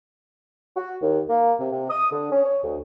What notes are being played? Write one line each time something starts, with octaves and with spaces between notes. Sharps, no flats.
F#4
D#2
A#3
C3
C3
D#6
D3
C#4
C#5
D2